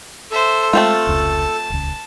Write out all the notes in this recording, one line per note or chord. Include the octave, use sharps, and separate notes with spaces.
A4 C5 E5
G#3 A3 C4 F4 A5
F1 C#2
D#1 C#2